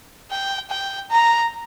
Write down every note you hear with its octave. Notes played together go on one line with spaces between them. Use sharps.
G5
G5
A#5